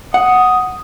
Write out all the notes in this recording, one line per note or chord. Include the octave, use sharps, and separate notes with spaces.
F#5 D#6